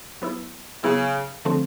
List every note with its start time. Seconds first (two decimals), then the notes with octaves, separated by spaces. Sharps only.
0.22 F#3 B3 E4
0.84 C#3 F#3 B3 E4
1.45 D3 F3 A3 C4